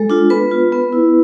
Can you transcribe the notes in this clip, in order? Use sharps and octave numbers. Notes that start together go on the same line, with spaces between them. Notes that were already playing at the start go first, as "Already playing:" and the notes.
Already playing: G#3 A4
D4 F4
B3 B4
F4
B3
E4